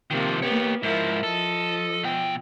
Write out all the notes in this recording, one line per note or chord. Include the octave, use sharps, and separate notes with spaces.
C3 D#3 F3 A#3
A#3 B3 G4 C#5
G#2 F3 E4 A#4
F3 A4 D#5
B2 G5